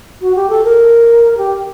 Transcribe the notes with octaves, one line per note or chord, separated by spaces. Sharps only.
F#4
G4
A4
A#4
G4